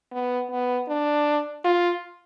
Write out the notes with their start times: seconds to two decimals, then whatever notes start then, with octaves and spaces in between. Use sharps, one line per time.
0.12 B3
0.51 B3
0.88 D4
1.65 F4